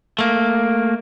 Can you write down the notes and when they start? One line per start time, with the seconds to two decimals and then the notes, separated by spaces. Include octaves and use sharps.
0.19 A3 A#3